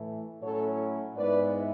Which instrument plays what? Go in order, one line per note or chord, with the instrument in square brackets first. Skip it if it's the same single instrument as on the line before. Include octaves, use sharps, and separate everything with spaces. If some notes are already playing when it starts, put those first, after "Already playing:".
Already playing: [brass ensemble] A2 E3 A3
A2 F#3 C#4 E4 A4 C#5
G#2 G#3 B3 E4 B4 D5